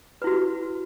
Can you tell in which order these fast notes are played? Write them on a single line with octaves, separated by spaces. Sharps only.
B4 E4 F#4